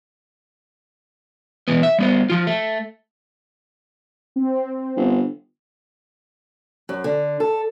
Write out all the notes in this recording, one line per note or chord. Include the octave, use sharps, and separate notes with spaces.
B2 E3 B3
E5
G3 B3 C5
F3 F4
A3
C4
G1
F#2
D3
A4